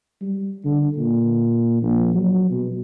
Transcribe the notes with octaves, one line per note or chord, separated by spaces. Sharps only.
G3
D3
A#2
A#1
F#3
B2